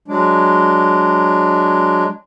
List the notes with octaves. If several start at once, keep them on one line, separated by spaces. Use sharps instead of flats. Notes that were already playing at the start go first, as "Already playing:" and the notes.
F#3 G#3 D4